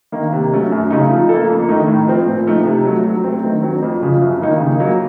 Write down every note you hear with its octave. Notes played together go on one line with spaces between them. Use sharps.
D#3 A#3
C3
F#3 A3 C#4
F#2
C#3 A3 D#4
F3
A#3 F4 A4
F2
D#3 A3 D#4
A2
F3 C4
A#2
F3 A3 D#4
C3
F#3 A3
F#3
A3 C4
D#3
F#3 C4
F2
C#3 F3
F#2
D#3 A#3 D#4
C#3
F#3 A#3